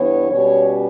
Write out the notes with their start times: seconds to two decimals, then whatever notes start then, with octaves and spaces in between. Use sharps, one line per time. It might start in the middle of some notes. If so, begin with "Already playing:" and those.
Already playing: G2 E3 B3 C#5
0.30 B2 G3 C#4 C#5